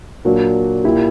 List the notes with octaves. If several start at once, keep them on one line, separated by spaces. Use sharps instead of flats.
A#2 F#3 A#3 D4 F#4
A#2 A#3 E4 G4